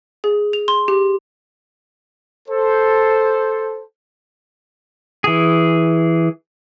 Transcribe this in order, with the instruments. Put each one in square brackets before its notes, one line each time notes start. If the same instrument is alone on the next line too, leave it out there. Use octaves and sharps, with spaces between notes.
[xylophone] G#4
F7
C6
G4
[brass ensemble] A4 C5
[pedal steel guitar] E3 G#4